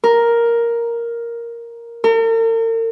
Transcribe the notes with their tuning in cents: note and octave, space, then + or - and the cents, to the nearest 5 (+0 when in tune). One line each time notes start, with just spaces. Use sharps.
A#4 +5
A#4 -45